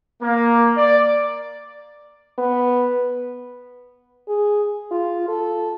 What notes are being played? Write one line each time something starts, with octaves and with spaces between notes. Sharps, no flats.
A#3
D5
B3
G#4
F4
A4